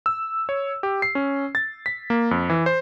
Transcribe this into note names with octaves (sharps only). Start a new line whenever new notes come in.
E6
C#5
G4
C7
C#4
A6
B6
A#3
F2
E3
C5